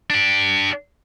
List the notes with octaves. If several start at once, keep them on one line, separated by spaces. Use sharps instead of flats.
D4 G4